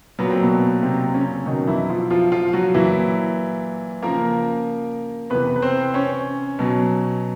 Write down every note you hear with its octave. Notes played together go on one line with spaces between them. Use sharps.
A#2 F#3 B3
C4
B2 B3
C3 C4
C4
C#3 C#4
B2 D#3 F#3 D#4
E3 E4
F3 F4
F3 F4
F3 F4
F#3 F#4
A#2 E3 F#3 E4
C#3 F3 A#3 A#4
C3 E3 B3 B4
B4
C4 C5
C#4 C#5
B2 F#3